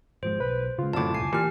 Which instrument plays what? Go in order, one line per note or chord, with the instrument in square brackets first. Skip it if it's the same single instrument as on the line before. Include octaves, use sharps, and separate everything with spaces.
[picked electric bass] G#1 F3 G#3 [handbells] C5
[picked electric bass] B1 [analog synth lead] B4
[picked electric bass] C#3 G#3 [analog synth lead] F4
[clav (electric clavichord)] C2 A2 [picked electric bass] F#2 D3 F#3 [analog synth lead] F4 [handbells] A5 D6
[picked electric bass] F1 C#2 A#2 [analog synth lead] G#5 [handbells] C7
[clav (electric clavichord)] A#2 [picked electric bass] E3 [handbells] G4 F6